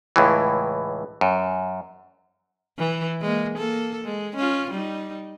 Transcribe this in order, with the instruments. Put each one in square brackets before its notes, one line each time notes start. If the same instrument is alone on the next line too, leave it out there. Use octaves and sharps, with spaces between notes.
[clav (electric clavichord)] C#2 A2 E3
F#2
[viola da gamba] E3
G#3 A#3
A#3 A4
G#3
C#4 F4
G3 D#4